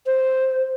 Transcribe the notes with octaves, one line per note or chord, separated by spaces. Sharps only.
C5